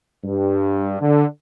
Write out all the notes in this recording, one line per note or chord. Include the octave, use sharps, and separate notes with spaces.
G2
D3